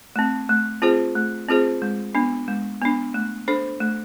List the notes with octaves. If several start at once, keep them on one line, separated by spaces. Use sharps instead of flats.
A3 C4
A3
C4 F4 G#4 C5
A3
C4 F4 G#4 C5
G#3
B3 D4
G#3
B3 D4
A3
D4 A4 C5
A3